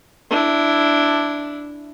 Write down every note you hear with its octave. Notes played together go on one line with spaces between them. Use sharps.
D4 E4